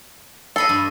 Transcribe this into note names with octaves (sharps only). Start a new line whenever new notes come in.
A4 D#5 B5 C6
G2